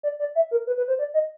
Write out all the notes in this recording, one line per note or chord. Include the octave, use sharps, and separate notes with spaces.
D5
D5
E5
A#4
B4
B4
C5
D5
D#5